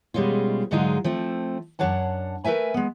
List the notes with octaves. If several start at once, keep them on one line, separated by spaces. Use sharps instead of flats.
B2 G3 G#3 C#4 F4
G#2 D3 F#3 G#3 D#4 F4
F3 A3 C4
F#2 C4 D4 C#5 F#5 A5
A3 A#4 B4 E5 G#5
G#3 B3